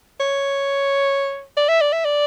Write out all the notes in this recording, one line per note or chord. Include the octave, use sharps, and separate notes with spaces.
C#5
D5
E5
D5
E5
D5